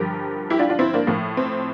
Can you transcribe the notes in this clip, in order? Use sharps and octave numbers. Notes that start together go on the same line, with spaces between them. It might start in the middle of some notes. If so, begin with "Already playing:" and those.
Already playing: G2 D3 F3 G4 A#4
E4 G4
D4 F4
D4 F4
C4 E4
A#3 D4
A2 F3
C4